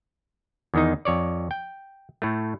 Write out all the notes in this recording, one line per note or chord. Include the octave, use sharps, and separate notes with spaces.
E2 D#3 D#4
F2 C#5 D5
G5
A2 A3